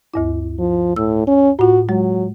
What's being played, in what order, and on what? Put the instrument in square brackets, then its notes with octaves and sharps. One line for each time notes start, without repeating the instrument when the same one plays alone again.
[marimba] D2 G2 E4
[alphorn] F3
[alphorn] A2 [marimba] E6
[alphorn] C#4
[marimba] A2 F4 [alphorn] F#4
[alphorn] F#3 [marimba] G#3